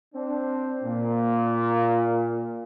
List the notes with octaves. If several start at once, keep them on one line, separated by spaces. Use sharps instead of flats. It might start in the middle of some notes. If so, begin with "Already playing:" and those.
C4 D4
A#2